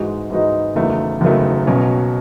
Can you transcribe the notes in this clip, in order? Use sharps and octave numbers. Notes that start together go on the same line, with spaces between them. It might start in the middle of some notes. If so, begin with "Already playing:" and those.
Already playing: G#2 E3 G#3 D#4 F#4
G#2 E3 G#3 D#4 F#4
F#1 E2 D#3 F#3 A3
F#1 E2 D#3 F#3 A3
B1 B2 F#3 C#4